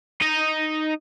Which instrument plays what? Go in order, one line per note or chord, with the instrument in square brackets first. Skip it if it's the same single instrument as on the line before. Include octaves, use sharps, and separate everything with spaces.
[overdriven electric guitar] D#4 D#5